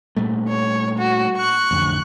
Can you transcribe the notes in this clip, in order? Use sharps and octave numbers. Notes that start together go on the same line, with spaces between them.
A#2 G3 A3
C#5
F#4
C#6 F#6
A1 F2 D3